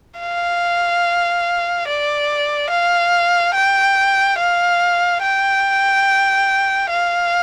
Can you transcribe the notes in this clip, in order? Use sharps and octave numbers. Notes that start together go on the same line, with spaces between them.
F5
D5
F5
G5
F5
G5
F5